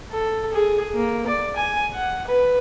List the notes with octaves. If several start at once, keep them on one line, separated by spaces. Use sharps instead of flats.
A4
G#4
A#3
D5
G#5
F#5
B4